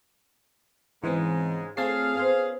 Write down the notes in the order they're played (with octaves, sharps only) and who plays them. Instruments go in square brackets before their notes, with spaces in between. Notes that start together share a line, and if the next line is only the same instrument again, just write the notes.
[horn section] G#2 C#3 G#3 [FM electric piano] E3 C4
[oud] A3 F4 C#5 [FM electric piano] C4 A5 C7 [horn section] G#4 F5
[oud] B3 C#4 C5